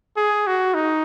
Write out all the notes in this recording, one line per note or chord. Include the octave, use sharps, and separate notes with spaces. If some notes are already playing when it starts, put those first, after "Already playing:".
G#4
F#4
D#4